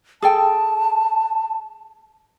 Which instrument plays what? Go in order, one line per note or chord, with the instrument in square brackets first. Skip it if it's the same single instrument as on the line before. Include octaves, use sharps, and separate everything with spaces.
[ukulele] G#4 A4 G5 [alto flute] A5